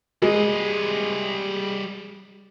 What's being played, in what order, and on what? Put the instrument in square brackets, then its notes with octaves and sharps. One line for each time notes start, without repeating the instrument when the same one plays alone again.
[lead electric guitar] G3 D#5 [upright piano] G#3